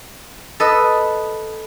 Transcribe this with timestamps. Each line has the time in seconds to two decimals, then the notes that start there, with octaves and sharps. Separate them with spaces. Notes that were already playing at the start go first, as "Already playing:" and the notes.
0.60 A4 B4 D#5